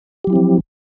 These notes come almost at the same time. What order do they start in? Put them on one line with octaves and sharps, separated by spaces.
G4 F#3 E4 C4 F3